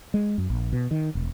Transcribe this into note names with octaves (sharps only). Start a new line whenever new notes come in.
G#3
F#2
A#1
B2
D#3
E1